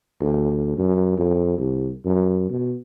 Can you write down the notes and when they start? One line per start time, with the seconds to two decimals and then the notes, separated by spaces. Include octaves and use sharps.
0.21 D2
0.78 F#2
1.17 F2
1.58 C2
2.05 F#2
2.50 B2